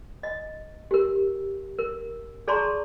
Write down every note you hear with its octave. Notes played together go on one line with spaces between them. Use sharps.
D#5
G4 A#4
A#4
G#4 D5 A5 A#5 C6 C#6